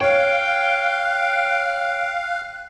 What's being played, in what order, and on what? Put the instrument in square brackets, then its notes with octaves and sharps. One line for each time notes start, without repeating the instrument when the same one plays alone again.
[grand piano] C#5 [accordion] F5 [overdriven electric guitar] G5 [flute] F#6